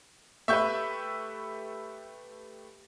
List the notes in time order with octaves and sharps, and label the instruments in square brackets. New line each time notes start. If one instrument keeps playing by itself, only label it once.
[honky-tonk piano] A3 G4 B4 [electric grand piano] E5 C#6 G6